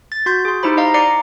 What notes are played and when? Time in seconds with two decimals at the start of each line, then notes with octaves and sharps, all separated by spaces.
0.12 A6
0.26 F#4 C6 G6
0.45 G#4 C6
0.63 D#4 E4 G4 C5 B5
0.77 D#5 F5 A#5
0.94 D5 A#5 D6 C7 C#7